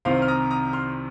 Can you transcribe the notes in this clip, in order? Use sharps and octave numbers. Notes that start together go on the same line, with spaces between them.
C2 C3 D#3 C4 C5 F5
F6
A#5 D#6
A#5 D#6
C6 F6